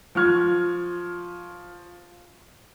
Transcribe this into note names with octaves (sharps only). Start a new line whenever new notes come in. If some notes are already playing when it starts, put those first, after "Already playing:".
F3 C#6 F6 G#6